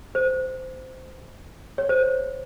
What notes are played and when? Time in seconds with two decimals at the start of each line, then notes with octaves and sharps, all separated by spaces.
0.15 C5
1.78 C#5
1.89 C5